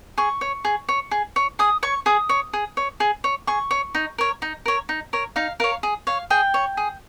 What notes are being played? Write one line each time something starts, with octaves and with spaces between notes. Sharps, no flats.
G#4 C#6
C#5
G#4
C#5
G#4
C#5
G#4 D#6
C#5 C#6
G#4 D#6
C#5
G#4
C#5
G#4
C#5
G#4 C#6
C#5
D#4
A#4 C#5
D#4
A#4 C#5
D#4
A#4 C#5
D#4 F5
A#4 C#5 F5
G#4
C#5 F5
G#4 G5
C#5
G#4